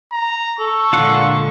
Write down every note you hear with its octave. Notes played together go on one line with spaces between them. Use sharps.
A#5
A4 C#6
A#2 D3 G#3 F4 F#5